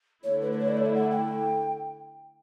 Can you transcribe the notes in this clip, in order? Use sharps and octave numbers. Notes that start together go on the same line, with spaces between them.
D3 A3 E4 C#5
B4
B4
C#5
D5
C#5
E5
F#5
G5